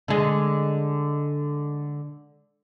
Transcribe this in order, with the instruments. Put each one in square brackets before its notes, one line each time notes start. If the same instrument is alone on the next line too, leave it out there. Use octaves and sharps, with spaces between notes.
[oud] D3 G#3